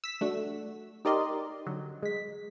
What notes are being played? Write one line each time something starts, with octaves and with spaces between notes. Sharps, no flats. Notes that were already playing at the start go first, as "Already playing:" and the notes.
E6 B6
A3 D4 F#4
D#4 G4 A#4 D5 D#5 C6
D3 F#3
G#3 B6